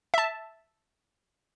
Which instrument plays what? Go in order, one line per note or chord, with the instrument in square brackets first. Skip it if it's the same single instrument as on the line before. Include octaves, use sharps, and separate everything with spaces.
[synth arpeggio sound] E5 A5